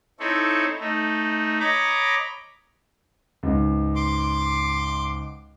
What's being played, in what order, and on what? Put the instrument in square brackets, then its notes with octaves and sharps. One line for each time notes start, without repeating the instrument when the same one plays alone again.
[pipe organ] C4 D#4 E4 A4 C#5
A3 D#4
C#5 D#5 A#5 B5 D6
[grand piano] C#2 G#2
[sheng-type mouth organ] C6 D6